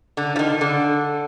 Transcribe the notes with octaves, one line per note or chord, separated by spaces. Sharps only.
D3
F3
D#3
D3